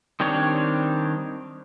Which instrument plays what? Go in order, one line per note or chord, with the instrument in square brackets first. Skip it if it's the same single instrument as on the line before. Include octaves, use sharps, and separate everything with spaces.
[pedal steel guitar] D#3 G3 C4 D4 C#5